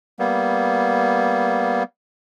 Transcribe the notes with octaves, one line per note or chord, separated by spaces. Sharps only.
G3 A#3 B3